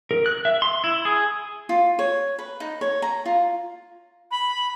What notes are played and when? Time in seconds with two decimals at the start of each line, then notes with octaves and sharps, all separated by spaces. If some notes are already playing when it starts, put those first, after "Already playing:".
0.11 A#4
0.26 F#6
0.45 E5
0.62 C6
0.84 E4
1.05 G#4
1.69 F4
1.99 C#5
2.39 B4
2.60 D#4
2.81 C#5
3.02 A#5
3.26 F4
4.31 B5